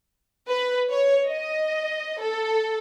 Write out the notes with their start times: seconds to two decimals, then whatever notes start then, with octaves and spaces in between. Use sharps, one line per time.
0.48 B4
0.91 C#5
1.28 D#5
2.21 A4